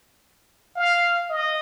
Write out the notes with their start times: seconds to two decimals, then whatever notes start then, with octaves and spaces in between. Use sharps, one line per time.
0.76 F5
1.29 D#5